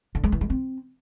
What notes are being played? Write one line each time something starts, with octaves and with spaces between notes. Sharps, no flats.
D3
G#3
E3
G#3
C4